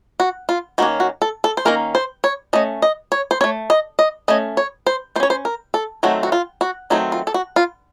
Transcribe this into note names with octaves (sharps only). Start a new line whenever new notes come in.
F#4
F4
D#3 A#3 C#4 F#4
F#4
A4
A4
C5
D#3 A#3 C#4 A#4
C5
C#5
A3 C#4 D#5
D#5
C#5
C5
A3 C#4 C#5
D#5
D#5
A3 C#4 D#5
C#5
C5
A3 C5
C#4 C#5
C5
A#4
A4
D#3 F#3 A3 C4 F#4
F#4
F4
F#4
D#3 F#3 A3 C4 D#4
F4
A4
F#4
F4